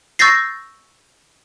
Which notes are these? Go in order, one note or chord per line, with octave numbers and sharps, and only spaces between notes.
C#6 E6 G6 A6 A#6 C7